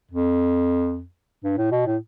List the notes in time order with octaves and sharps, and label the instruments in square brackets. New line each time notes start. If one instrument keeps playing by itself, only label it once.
[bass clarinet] F2
G2
A2
B2
A2